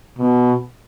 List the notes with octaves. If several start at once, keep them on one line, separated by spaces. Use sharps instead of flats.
B2